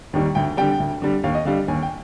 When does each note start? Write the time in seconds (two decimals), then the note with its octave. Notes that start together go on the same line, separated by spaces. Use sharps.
0.13 D#2 D#3 G3
0.35 D2 G5
0.57 D3 G3 G5
0.80 D2
1.02 D3 G3
1.24 D#2 F5
1.35 D#5
1.45 D3 G3 F5
1.68 D#2 G#5
1.82 G5